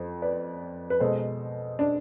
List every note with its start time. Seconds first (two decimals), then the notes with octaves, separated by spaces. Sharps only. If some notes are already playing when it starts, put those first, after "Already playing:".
Already playing: F2 C5
0.22 B4 D5
0.90 B4
1.00 B2 G#3 A4 C5
1.79 D4